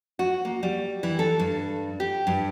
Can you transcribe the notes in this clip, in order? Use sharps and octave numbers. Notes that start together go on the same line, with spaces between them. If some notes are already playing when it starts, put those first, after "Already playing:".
F#4
A#3
G3
E3
A4
G2
G4
G2